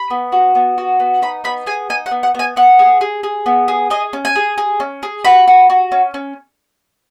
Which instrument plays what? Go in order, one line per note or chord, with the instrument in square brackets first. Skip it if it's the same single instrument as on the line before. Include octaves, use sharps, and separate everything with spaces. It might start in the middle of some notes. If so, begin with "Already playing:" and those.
Already playing: [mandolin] B5
B3
F#4
B3
F#4
B3
D#4 B5
B3 B5
G#4 G#5
D#4 G#5
F#5
B3
F#5
B3 G#5
B3 F#5
G#4
G#4
G#4
B3
G#4
G#4 D#5
C#4
G#5
G#4
G#4
C#4
G#4
F#4 B5
F#4
F#4
C#4
C#4